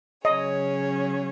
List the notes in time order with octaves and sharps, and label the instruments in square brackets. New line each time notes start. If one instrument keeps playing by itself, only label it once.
[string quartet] C#3 F#3 C#4 G#4 C#5 [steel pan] D#5